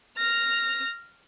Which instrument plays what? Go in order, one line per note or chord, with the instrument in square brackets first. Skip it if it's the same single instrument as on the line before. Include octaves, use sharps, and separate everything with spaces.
[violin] F6 A#6